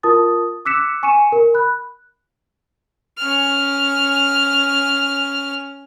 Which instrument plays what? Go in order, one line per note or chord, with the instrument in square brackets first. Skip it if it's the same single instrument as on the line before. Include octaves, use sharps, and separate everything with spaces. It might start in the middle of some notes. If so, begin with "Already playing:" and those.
[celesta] F4 A#4 A5 D#6 A6
D6 E6 F#6 B6 C#7 E7
G#5 C#6 C#7 D#7 E7
A#4
B5 F#6
[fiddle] C#4 F6